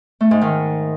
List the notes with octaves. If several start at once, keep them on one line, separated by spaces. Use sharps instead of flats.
A3
G#2
D#3